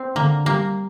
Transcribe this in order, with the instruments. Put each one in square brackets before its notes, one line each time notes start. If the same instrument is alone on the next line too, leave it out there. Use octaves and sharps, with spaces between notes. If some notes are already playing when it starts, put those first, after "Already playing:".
Already playing: [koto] C4
[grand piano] D3 [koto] A#3
[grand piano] G3 [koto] A#3